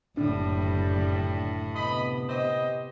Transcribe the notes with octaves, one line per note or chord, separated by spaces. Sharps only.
F#1 A2 D3 G3 D4
C3 B3 D#5 B5
G4 C5 D#5